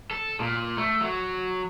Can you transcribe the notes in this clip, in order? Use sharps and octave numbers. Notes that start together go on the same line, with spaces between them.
A4
A#2
A3
F#3